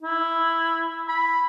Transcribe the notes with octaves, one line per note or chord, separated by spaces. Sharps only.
E4
B5